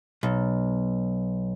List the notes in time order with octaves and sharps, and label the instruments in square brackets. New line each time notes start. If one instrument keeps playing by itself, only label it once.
[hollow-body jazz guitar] B1